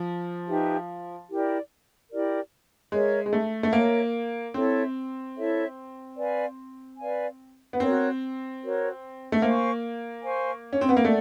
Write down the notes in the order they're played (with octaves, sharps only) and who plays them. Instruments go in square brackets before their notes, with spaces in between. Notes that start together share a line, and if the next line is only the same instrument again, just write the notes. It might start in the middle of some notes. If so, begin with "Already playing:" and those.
Already playing: [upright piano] F3
[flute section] D#4 G4 B4 E5
E4 G4 A#4 D5
E4 G4 A#4 D5
[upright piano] G#3 [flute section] A#4 C#5 E5
[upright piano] G#3
A3
A3
[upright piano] A#3 [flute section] A#4 C#5 E5
[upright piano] C4 [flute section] E4 A4 C#5 E5
[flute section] E4 A4 C#5 E5
B4 D5 F5 G#5
B4 D5 F5 G#5
[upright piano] B3
[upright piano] C4 [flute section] F#4 A#4 C#5
[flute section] F#4 A#4 C#5
[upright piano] A3
[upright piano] A#3 [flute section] C5 F5 G#5 C#6
[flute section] C5 F5 G#5 C#6
[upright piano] C#4
C4
B3
A#3
[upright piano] A3 [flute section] A4 D5 F#5